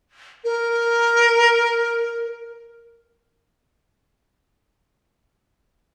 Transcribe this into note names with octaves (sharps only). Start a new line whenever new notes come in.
A#4